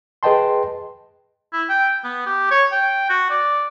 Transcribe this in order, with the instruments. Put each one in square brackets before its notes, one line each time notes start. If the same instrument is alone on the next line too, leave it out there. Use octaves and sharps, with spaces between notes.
[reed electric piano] G#4 B4 D#5 G5 A5 C6
[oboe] E4
G5
B3
G4
C#5
G5
F#4
D5